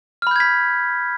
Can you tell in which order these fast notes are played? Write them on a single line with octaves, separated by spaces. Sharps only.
F6 B5 G6 G#6 B6